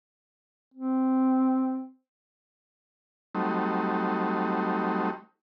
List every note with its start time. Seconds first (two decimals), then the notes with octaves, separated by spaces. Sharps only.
0.74 C4
3.35 F#3 G3 A3 C4 D#4